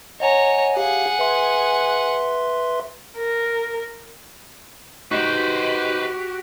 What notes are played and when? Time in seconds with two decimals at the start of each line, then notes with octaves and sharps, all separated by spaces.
0.20 C#5 D#5 F#5 G#5 A#5
0.77 G4 G#4 F5 F#5
1.19 B4 E5 C6
3.17 A#4
5.11 D#4 F#4 G4 B4 C5